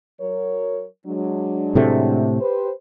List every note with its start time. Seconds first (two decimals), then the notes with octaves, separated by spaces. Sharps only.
0.21 F#3 A#4 C#5
1.06 F#3 G#3 D4
1.75 A2 C3 A3
2.40 G4 B4 C5